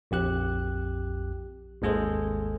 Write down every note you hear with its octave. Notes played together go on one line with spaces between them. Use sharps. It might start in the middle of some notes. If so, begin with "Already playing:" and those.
A#1 F2 G4 F#6
G#1 D#2 G#3 G#4 A4 C5